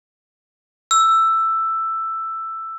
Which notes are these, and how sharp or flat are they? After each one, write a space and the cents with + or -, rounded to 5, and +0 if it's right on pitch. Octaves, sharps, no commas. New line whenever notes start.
E6 +10